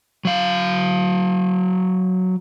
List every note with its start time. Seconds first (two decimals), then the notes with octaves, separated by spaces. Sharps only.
0.25 F#3 F5